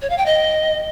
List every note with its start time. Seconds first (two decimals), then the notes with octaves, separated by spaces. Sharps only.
0.02 C#5
0.10 F5
0.18 G5
0.26 D#5